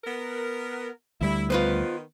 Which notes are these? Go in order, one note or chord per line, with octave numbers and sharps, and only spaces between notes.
B3 A#4
D2 G3 E4
D#3 B3 F4 B4 C5